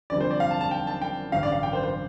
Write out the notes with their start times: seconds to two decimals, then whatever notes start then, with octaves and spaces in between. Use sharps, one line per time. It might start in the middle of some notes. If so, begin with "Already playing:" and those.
0.10 F1 F2 D3 G3 D5
0.21 C5
0.31 D5
0.40 F5
0.51 A5
0.61 A5
0.71 G5
0.87 A5
1.01 G5
1.32 A1 G2 D3 F5
1.43 D5
1.52 F5
1.63 G5
1.73 C5
1.84 C5